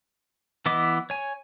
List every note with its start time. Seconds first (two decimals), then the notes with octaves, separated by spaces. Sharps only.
0.66 E3 B3 E4 D#5 D6
1.10 C#5 G#5